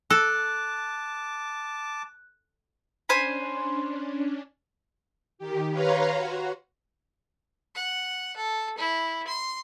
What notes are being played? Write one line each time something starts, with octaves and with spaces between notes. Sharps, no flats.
A4 A5 D6 F#6
C#4 D4 C5 G#5 B5
D#3 G4
B4 C#5 F5 A#5 C6
F#4
F#5
A4
E4
C6